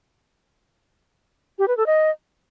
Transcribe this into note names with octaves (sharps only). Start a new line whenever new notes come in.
G4
B4
A4
D#5